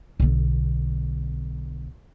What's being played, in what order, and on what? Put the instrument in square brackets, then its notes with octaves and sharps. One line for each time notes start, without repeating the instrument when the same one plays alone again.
[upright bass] B1 D3